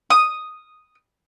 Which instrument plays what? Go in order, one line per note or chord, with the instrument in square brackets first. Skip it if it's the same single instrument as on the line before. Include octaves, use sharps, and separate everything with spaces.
[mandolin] D#6